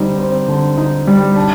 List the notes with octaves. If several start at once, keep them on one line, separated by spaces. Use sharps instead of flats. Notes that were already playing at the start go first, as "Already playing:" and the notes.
Already playing: D3 G3 C4 D#4
C4
D3
D#4
G3
D4